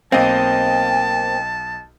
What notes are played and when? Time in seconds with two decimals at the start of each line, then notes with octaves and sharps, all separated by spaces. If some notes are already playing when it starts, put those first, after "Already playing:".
0.12 B1 A#3 C4 D#5 F5 G5 A5